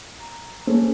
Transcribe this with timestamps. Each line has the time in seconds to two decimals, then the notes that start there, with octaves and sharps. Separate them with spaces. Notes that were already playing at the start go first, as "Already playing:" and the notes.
0.20 A#5
0.67 A#3 C#4 G#4 A4 C5